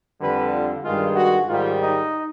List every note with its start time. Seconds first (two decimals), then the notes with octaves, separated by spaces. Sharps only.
0.20 F2 D3 G3 B4
0.52 F4
0.84 G2 D#3 G#3 F4
1.15 F#4
1.48 G#2 D#3 G3 F4
1.80 D#4